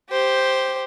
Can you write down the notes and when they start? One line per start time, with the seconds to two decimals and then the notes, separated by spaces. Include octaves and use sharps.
0.10 G4 C5